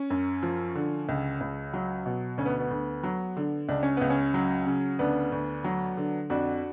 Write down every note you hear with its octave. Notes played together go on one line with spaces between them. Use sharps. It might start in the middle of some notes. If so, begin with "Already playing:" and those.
Already playing: C#4
F#2
F3
D3
C#2
C#2
F#3
B2
D2 C#4
B3
B3
D2
F#3
D3
C#2 D4
C#4
C#2 B3
C#4
F#3
C#3
D2 B3 D4
D2
F#3
D3
F2 D4 F#4